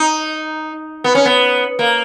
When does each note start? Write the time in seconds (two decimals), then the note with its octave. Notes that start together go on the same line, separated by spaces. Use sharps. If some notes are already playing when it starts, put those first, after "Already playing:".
Already playing: D#4
1.04 B3
1.15 C#4
1.25 B3
1.79 A#3